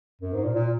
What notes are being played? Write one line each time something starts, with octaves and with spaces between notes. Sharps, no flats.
F#2
G#2
A#2
A#2